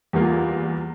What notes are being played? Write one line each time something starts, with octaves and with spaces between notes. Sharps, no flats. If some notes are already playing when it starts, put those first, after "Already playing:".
E2 G3 A#3 F4